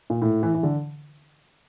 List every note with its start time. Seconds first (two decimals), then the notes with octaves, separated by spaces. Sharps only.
0.10 A#2
0.22 A2
0.43 E3
0.54 E3
0.63 D3